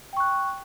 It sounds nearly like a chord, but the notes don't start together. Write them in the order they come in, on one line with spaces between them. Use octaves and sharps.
G5 C#6 F#6